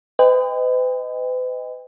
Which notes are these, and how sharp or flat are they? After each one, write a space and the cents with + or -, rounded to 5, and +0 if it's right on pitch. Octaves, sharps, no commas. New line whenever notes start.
B4 +45 D#5 +0 G5 +35